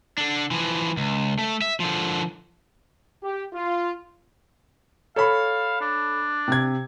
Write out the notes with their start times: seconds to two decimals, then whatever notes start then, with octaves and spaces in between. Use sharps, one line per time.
0.18 D3 D4
0.51 E3 F3
0.97 C#2
1.39 A3
1.62 E5
1.80 D3 F3
3.23 G4
3.53 F4
5.16 A4 C#5 F5 B5
5.81 D4
6.48 C3 G#6